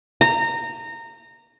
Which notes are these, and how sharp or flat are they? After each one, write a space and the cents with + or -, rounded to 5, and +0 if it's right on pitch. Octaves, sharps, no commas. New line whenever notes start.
A#5 -20